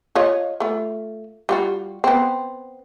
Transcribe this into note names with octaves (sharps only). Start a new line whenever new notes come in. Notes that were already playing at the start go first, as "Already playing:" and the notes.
F4 C#5 D#5
A3 F4
G3 F4 F#4
B3 C4